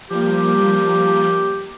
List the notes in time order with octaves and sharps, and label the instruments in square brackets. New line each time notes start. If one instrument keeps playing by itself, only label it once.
[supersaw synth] F3 G3 A#3 [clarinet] G4